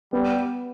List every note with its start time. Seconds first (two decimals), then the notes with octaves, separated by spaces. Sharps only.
0.13 G3 B3